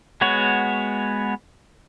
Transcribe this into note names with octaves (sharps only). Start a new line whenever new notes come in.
G#3 B3 F#4 C#5